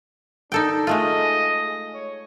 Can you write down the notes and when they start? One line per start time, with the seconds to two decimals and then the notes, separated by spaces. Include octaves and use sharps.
0.52 D4 D#4 A4 G5
0.87 G#3 A3 F4 D#5
1.94 C#5